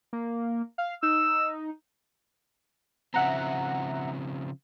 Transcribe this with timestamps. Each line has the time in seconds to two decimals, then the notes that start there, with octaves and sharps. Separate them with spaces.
0.13 A#3
0.78 F5
1.03 D#4 E6
3.14 C#3 F3 C4 E5 F#5 A#5